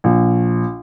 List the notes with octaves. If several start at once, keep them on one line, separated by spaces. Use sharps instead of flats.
A#1